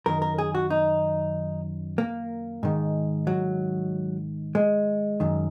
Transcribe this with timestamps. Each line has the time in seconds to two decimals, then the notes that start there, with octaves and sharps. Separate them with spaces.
0.06 F#2 D#3 A#4
0.22 A#4
0.38 G#4
0.55 F#4
0.70 D#4
1.98 A#3
2.63 G#2 D#3
3.27 F#3
4.55 G#3
5.20 F#2 D#3